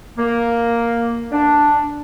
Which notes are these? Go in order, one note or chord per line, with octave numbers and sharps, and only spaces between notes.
A#3
D4